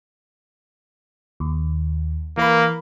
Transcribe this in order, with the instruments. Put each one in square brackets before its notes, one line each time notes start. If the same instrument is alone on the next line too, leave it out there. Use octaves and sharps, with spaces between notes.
[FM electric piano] D#2
[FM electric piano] E3 A#4 B5 [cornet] A#3